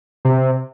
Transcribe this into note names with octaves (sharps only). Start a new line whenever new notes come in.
C3